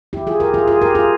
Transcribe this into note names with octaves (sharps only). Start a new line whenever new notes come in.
E4 G4
F4 G#4
G4 A#4
F4 G#4
F4 G#4
G4 A#4
F4 G#4